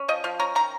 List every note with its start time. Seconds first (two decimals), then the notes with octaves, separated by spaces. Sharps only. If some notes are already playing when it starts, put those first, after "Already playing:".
Already playing: C#4
0.08 F3 D#5
0.24 F3 F5
0.39 C#4 A#5
0.55 D#3 A#5